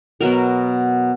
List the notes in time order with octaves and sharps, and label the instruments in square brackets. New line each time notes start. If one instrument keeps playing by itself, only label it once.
[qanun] B2 F#3 B3 A#4